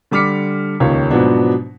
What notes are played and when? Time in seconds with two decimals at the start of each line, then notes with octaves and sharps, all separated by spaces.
0.11 D3 G3 D6 F6 B6 C#7
0.80 D#1 C#2 D#3 C#5
1.11 G#2 B2 F3 F#3 B3 D4